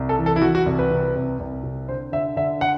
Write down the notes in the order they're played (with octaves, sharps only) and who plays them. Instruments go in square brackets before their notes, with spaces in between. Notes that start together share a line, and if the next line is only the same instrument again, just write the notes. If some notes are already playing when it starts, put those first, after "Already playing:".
Already playing: [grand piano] C2
A4
E3
A4
E4
E3 F#4
F#4
C2
B4
C3
C2
C2
C3
D3 C5
D3 E5
D3 E5
D3 F#5